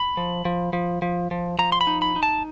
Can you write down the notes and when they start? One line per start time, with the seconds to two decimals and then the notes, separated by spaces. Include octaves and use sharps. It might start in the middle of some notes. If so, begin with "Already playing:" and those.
Already playing: B5
0.17 F3
0.45 F3
0.73 F3
1.02 F3
1.31 F3
1.59 F3 A#5
1.72 C6
1.81 B5
1.87 D#4
2.02 B5
2.16 D#4
2.23 A5